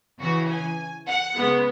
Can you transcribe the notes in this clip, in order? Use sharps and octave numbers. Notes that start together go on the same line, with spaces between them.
C#3 E3 C#4 F#4
G#5
F#5
C#3 G#3 B3